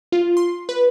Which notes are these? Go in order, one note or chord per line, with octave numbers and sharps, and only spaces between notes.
F4
C6
B4